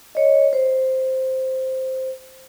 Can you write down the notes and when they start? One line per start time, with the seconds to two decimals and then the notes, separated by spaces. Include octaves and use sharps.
0.15 C#5 D#5
0.53 C5